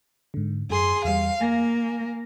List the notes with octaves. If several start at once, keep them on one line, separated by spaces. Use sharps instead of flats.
G#2 D3
F#2 G#4 C6
E2 G3 F5
A#3 G#5 A#6